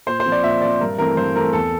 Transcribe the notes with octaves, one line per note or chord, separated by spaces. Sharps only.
A#2 C5
C5
F3 C4
D5
A#2 E5
F3 C4 D5
G2 A#4
E3 A3 C4 A#4
G2 C5
E3 A3 C4 A#4
E2 A4